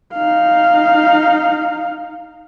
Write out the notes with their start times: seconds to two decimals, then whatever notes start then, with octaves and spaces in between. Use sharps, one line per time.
0.14 D#4 F5